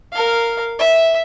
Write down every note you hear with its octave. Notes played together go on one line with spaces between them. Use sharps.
A#4 F5
E5